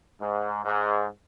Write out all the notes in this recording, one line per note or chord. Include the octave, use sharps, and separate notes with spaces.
G#2
G#2